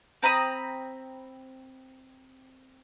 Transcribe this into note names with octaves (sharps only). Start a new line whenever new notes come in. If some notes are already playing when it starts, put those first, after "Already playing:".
C4 A#5 B5 D#6